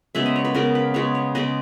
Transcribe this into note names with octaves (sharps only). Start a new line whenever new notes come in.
C#3 G#3 B3 E5
D#5
C#5
B4
C#3 G#3 B3 A#4
B4
C#3 G#3 B3 C#5
C#5
C#3 G#3 B3 D#5